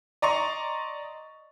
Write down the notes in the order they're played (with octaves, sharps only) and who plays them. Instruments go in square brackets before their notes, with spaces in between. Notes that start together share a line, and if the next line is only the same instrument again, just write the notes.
[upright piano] D5 D#5 A#5 C6 C#6